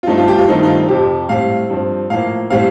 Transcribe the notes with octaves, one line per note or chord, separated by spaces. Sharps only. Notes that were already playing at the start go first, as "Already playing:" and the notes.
F4
G2 F3 A3 D#4
F4
G4
F4
G2 D#3 A3 C4 D#4
D#4
F4
F2 C3 F3 G4
A2 G3 C4 F5
G2 F3 C4
A2 F3 A#3 F5
A2 G3 C4 F5